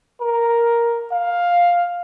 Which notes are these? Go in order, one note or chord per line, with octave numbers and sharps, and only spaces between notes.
A#4
F5